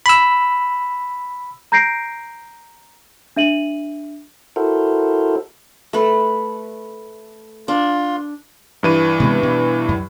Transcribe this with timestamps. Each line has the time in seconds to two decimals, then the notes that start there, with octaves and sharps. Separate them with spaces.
0.06 B5 E6
1.72 A#5 G6 A#6 C7 D7
3.36 D4 E5 D#7 F#7
4.56 E4 F#4 A4 A#4 C5
5.93 A3 B4
7.68 D4 F4
8.83 G2 E3 D#7
9.20 C3 G#3 B3
9.43 B2
9.89 F#2